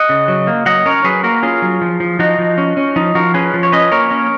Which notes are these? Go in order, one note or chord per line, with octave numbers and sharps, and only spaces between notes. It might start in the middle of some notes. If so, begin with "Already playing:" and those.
Already playing: D#5 F#5
C#3
F#3
A#3
F#3 D#5 F#5
C#4 A#4 C#5
F#3 G#4 B4
A#3 F#4 A#4
C#4 F4 G#4
F#3
F3
F3
F3 D#4 F#4
F3
C#4
C#4
F3 D#4
F3 F#4 A#4
C#4 G#4 B4
F3
C#5
C#4 B4 D#5
A#3 A#4 C#5
C#4